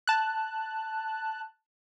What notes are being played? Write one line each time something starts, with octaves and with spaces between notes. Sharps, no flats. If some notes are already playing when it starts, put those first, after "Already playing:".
A5 F#6